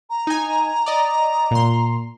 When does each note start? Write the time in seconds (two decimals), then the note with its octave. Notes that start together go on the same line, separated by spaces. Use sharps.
0.10 A#5
0.27 D#4 G#5
0.86 D5 D#5
1.51 A#2 C6